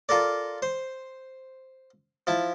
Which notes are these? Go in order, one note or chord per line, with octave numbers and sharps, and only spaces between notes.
F4 A4 A#4 D5
C5
F3 E4 A5